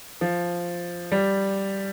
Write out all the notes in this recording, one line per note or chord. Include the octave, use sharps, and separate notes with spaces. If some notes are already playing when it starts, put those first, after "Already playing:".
F3
G3